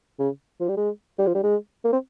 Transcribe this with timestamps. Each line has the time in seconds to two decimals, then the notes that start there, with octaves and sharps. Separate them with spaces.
0.19 C#3
0.60 F3
0.69 G3
0.77 G#3
1.18 G3
1.27 F3
1.35 G3
1.43 G#3
1.84 A#3
1.93 C4